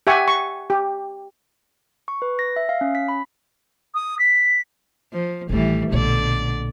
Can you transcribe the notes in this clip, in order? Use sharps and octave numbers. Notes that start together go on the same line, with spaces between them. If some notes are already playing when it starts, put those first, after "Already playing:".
G4 E5 F#5 G#5 C#6
C#6
G4
C#6
B4
A#6
E5
F5
C#4
B6
B5
D#6
B6
F3
A1 D#3 E3 G3 A3
A#1 B2 D3 A3 D5